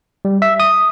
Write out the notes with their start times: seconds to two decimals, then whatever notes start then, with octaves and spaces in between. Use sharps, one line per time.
0.25 G3
0.42 E5
0.60 D#6